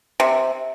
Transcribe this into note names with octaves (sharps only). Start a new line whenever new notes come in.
C3